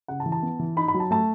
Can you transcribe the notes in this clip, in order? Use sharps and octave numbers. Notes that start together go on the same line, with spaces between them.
C#3 F#5
A5
E3
A5
B3
E3
D#4 B5
B5
F#3
A5
A3 A5